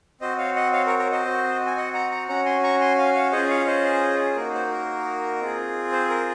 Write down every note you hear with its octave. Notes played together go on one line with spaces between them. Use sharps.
C4 F#4 C5 D#5
C#5 F5
D#5 F#5
C#5 F5
A#4 C#5
A#4 C#5
C5 D#5
C4 F#4
G#5
D#5 F#5
F#5 A#5
F#5 A#5
C#4 F#4 F#5 A#5
G#5 C6
A#5 C#6
G#5 C6
F5 G#5
C#5 F5
C#4 F4 G#4 C5 D#5
C#5 F5
C5 D#5
A#3 D#4 F#4 A#4
C5
A#4
C4 F4 G#4
C5
A#4